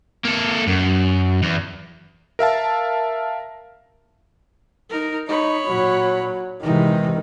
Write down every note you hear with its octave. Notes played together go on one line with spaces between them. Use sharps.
A#3 A4
F#2
E2
A#4 E5 F5 A5
D#4 A#4
D#4 C#5 B5
A#2 F#3
C3 D#3 E3 G#3 D#4